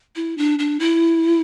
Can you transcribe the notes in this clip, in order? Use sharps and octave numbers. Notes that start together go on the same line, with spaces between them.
E4
D4
D4
E4